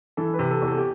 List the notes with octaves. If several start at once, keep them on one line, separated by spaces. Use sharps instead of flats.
E3 A4
B4
C3
A4
E2
A4
G4